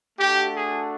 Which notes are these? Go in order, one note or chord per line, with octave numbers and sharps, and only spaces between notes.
A3 D4 F#4 G4
G#4